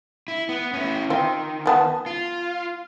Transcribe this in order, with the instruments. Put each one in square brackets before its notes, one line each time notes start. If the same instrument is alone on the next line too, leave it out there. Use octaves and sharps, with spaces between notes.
[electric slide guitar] E4
B3
C#4 E4
[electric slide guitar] D#3 [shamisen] C4 F4
[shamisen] F3 B3 A5
[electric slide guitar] F4